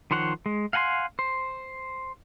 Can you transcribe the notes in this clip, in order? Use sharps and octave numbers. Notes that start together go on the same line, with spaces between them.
D#3 F3 C5 C#5 F#5
G#3
F5 F#5 G#5 A#5 C6
C5